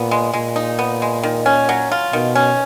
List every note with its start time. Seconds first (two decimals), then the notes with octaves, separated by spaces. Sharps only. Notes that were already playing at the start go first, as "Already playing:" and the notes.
Already playing: A#2 B3
0.11 G#3
0.34 A#2 G#3
0.56 D#4
0.79 B3
1.02 G#3
1.23 D#3
1.46 C#4
1.69 F#3
1.92 F4
2.13 B2 D#3
2.35 C#4